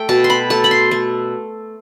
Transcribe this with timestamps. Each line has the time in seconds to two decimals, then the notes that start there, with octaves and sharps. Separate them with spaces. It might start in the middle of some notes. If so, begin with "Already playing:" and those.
Already playing: A3 E5 G5
0.09 B2 A5
0.24 C6
0.30 B5
0.50 A3 A5
0.64 B5
0.71 C6
0.91 A3